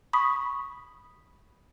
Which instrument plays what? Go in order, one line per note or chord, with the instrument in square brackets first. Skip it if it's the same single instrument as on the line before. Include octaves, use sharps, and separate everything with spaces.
[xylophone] B5 C#6 D#6 B6